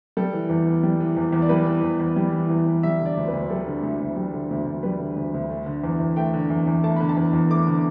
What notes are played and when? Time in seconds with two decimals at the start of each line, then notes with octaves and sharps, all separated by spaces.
0.17 G3 A4
0.33 E3
0.49 E2
0.66 E2
0.83 G3
1.00 E3
1.17 E2
1.33 E2
1.42 D5
1.49 G3 B4
1.66 E3
1.83 E2
2.00 E2
2.16 G3
2.33 E3
2.50 E2
2.67 E2
2.83 G3 E5
3.00 D3
3.06 D5
3.17 D2
3.28 B4
3.33 D2
3.50 G3 A4
3.66 D3
3.83 D2
4.00 D2
4.16 G3
4.33 D3
4.51 D2
4.66 D2
4.83 G3 B4
5.00 D3
5.16 D2
5.34 D2
5.50 A3
5.66 D3
5.84 E2
6.00 E2
6.16 A3 G5
6.34 D3
6.50 E2
6.67 E2
6.84 A3 A5
6.96 D3 B5
7.09 A5
7.17 E2
7.33 E2
7.50 A3 D6
7.67 D3